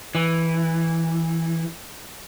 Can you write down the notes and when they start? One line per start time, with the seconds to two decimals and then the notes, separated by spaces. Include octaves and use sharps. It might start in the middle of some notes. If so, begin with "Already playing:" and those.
0.15 E3